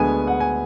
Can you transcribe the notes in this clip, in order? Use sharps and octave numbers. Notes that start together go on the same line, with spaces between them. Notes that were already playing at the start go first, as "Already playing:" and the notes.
Already playing: D2 D3 G#3 B3 G#5
F#5
G#5